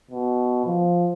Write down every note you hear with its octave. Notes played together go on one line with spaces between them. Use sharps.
B2
F3